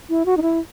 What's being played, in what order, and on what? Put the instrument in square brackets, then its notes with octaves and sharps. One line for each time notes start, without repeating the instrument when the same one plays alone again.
[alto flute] E4
F#4
D#4
E4